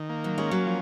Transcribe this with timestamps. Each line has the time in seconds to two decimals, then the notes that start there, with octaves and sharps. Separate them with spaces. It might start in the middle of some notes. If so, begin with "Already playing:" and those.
Already playing: D#3
0.09 A#3
0.24 F#3
0.38 G#3 C#4
0.51 F#3
0.66 F3